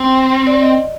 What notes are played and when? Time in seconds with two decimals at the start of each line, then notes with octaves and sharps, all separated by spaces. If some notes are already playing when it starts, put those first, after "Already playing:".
Already playing: C4
0.47 D5
0.62 D#5